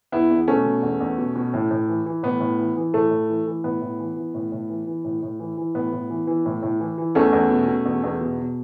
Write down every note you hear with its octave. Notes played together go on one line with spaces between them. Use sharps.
E2 B3 E4
E2
B2 A3 C#4
B2
E2
E2
B2
B2
A2
A2
E3
E3
A2 B3
A2
E3
E3
A2 A3
A2
E3
E3
A2 B3
A2
E3
E3
A2
A2
E3
E3
A2
A2
E3
E3
A2 B3
A2
E3
E3
A2
A2
E3
E3
E2 A3 C#4
E2
B2
B2
E2
E2
B2
B2